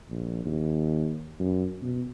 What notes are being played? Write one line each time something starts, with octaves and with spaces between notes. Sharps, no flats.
A#1
D#2
F#2
B2